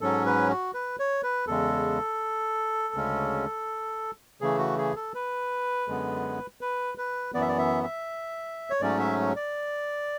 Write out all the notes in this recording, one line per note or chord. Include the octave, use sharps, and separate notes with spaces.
G#2 F#3 C#4 A4
B4
F#4
B4
C#5
B4
E2 C#3 G#3 A4
D2 C#3 G#3 C#4
C#3 E3 A3 G#4
F#4
G#4
A4
B4
F#2 D3 G#3 B3
B4
B4
F#2 E3 B3 D5
E5
D5
E5
E5
C#5
G#2 F#3 A3 C#4 D5
E5
D5